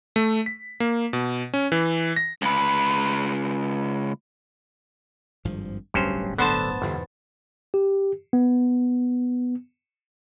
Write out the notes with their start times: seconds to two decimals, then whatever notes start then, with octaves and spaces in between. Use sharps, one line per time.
0.16 A3
0.46 B6
0.80 A#3
1.13 B2
1.54 C#4
1.72 E3
2.16 A#6
2.42 C#2 B4
5.45 G#1 G2 F3
5.94 D1 G1 G2 F#3 C#4 C5
6.38 D3 B3 C5 A5
6.82 G1 E2 G#2 B2
7.74 G4
8.33 B3